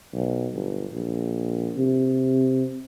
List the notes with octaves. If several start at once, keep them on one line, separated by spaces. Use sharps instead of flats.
B1
G1
A#1
C3